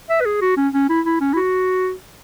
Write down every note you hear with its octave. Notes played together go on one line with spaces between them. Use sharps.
E5
B4
G#4
F#4
C#4
C#4
E4
E4
C#4
E4
F#4